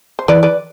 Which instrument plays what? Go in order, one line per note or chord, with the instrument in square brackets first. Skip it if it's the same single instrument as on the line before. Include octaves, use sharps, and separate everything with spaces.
[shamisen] C5
[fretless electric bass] E3 [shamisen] B4 D5
[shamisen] B4 D5